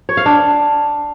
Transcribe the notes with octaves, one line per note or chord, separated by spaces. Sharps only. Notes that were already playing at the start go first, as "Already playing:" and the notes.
C#5
F5
D4